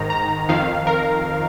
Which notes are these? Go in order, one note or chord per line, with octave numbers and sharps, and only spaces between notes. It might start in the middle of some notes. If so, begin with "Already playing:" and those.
Already playing: G#2 D#3 A#5
A#5
F2 D#3 F5
A#4